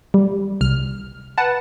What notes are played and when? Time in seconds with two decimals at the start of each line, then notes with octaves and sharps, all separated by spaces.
0.14 G3
0.61 C2 F6
1.38 B4 F#5 A5